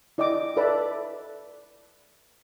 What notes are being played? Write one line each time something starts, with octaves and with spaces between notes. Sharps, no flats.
E4 D5 D#5 G5 D6
A4 B4 D5 E5 A5 B5